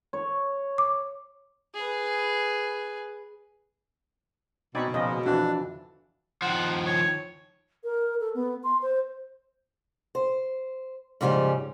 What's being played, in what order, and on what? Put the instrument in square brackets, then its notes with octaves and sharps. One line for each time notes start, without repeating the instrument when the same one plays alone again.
[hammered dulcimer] C#5
[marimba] D6
[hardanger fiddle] G#4 B4
[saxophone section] B2 [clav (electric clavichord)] C4 D5 G#5 [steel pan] D#4 B5 C#6
[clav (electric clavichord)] A#2 C#3 F3 [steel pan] D#5
[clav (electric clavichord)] F2 E3 [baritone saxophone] D4 [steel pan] F#4
[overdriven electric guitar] D#3 F3 [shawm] F#5
[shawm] C#5
[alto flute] A#4
A4
B3
C6
C5
[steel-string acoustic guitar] C5
G#2 C#3 F3 G3 C#4